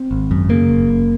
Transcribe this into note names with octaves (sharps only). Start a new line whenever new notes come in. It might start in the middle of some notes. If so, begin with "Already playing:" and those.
Already playing: C4
G#1
F#2
C#3 A#3
F#1
F#1